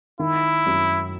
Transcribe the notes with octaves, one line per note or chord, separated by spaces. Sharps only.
D#3 E4
F#2